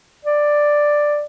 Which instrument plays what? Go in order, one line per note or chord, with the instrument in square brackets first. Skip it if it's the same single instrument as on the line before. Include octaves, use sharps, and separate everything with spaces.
[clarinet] D5